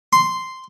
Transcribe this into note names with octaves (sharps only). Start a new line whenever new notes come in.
C6